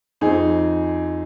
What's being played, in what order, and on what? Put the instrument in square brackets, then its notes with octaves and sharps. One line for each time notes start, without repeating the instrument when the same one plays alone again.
[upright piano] F2 F3 C4 D#4 G#4